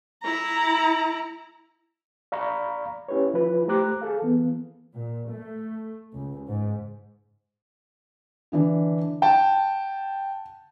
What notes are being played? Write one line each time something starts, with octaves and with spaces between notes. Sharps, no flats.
E4 A#5
D5 F5 A#5 B5 C#6
C#4 E4 G4 B4 C#5
F3 E4 F4 B4
A3 G4 C5 A#5 D6 F#6
G#4 A4 F5
E3 B3
A#2
A3
C#2
G#2
D3 E3 D4
F#5 G5 A5